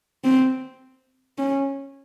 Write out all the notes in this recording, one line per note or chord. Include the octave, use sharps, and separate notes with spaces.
C4
C#4